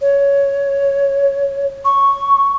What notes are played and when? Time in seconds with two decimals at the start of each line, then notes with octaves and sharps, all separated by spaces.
0.01 C#5
1.85 C#6